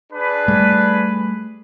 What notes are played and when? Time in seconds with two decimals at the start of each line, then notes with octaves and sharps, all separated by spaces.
0.12 D4 G#4 B4
0.48 G3 A3